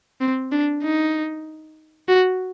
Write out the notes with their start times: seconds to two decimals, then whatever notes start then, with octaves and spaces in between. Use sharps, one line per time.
0.21 C4
0.52 D4
0.83 D#4
2.08 F#4